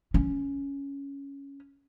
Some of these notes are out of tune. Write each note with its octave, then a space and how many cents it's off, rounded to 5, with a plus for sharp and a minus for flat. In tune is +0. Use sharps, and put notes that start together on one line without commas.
C#4 +5